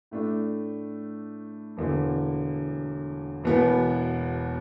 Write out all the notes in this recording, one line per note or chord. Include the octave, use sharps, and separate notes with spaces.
A2 A3 D4
E1 E2 D3
E1 E2 B2 B3